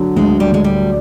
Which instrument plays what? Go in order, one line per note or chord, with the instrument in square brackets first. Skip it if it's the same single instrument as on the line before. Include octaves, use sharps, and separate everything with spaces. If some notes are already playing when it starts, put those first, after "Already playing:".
Already playing: [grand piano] D3 F#3
[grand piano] D2 [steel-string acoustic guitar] G#3
[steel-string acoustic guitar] G3
[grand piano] D2 [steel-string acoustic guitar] G#3
[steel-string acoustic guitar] G3